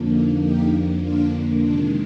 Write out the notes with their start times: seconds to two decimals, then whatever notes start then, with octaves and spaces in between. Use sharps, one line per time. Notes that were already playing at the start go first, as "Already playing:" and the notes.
Already playing: F2 D3 F3 A#3
0.10 D#4
0.40 D#4 G4
1.01 D4 F4
1.62 C3 D#3 G#3 D4 F4